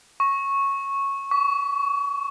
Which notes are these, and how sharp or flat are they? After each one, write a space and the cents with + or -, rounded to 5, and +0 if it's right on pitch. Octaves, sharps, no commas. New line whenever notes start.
C#6 -10
C#6 +35